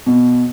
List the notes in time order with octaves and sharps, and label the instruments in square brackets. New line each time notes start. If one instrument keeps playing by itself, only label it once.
[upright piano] B2